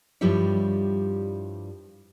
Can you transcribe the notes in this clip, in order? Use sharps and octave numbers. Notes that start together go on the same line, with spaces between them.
G2 F3 G3 E4 G4 C#5